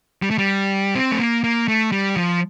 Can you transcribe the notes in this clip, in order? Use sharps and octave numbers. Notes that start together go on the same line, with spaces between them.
G3
A3
G3
C4
A3
A#3
A#3
A3
G3
F3